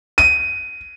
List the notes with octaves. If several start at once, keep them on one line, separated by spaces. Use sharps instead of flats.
D#7